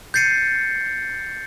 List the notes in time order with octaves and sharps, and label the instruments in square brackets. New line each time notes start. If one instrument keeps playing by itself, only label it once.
[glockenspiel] G6 A6 C7 C#7 D#7